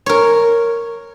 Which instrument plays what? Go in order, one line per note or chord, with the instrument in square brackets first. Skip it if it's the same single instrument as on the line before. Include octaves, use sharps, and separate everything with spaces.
[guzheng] A#4 C#5